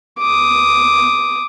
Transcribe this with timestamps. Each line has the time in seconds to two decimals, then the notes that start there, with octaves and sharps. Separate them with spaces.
0.19 D6 D#6